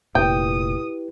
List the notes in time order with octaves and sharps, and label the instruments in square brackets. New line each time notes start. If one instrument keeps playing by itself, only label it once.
[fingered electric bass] F1 A#2 [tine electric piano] E4 G4 B4 [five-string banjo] G5 [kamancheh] D#6